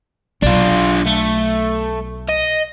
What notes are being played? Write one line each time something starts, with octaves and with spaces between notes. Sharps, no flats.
B1 D4 F4
A3
D#5